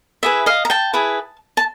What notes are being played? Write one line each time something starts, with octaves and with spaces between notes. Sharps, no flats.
E4 G#4 B4 E5
D#5 F5
A#5
G5 A5
E4 G#4 B4
A5